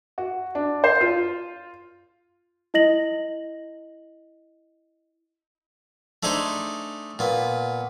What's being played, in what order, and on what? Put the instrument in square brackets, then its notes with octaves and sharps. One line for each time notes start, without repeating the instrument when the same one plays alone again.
[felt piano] F#4
D4
C5
F4
[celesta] E4 D#5 A#6 F#7
[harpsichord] A3 D4 D#4 G#4 C5
A#2 B3